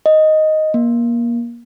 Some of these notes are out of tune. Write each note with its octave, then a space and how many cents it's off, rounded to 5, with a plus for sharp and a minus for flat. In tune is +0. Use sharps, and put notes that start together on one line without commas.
D#5 +0
A#3 +25